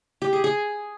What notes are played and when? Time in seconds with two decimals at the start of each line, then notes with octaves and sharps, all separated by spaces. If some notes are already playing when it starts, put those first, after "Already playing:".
0.22 G4
0.33 G#4
0.44 G#4